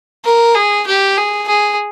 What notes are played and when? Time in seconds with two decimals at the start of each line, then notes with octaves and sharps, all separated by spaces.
0.24 A#4
0.55 G#4
0.86 G4
1.17 G#4
1.48 G#4